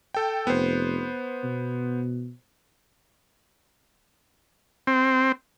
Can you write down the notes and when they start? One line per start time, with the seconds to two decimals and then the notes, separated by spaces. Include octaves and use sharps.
0.14 A4 G5
0.47 F1 B3 C5
1.44 B2
4.87 C4